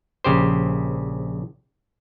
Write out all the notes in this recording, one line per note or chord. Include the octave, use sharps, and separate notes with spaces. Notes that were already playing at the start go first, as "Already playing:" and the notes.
A#1 C#3 G4 C5